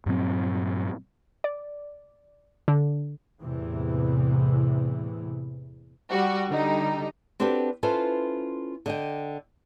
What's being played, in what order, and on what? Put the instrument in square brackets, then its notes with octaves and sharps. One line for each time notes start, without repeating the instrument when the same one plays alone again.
[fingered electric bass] G2 A#2 F#3 C4
[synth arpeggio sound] D5
D3
[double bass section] E2 A2 C3 E3
[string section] G3 F#4
D3 G3 D#4
[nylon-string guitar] C4 D4 F#4 G4 A4 B4
C#4 E4 F4 A4 B4 C5
D3 D#5 G5